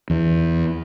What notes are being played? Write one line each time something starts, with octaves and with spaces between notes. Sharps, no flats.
E2